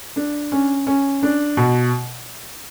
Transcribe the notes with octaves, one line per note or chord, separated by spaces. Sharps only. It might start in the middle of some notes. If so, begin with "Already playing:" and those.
D4
C#4
C#4
D4
B2